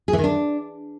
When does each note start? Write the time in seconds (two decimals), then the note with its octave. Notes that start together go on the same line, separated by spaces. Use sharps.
0.08 G#4
0.13 E3
0.18 D#3
0.24 D4